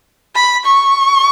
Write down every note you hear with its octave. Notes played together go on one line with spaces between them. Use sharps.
B5
C#6